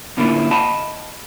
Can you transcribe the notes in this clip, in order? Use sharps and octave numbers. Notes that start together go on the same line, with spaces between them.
A2 D3 A#3 C#4 E4 F4
D#5 F5 G5 A5 B5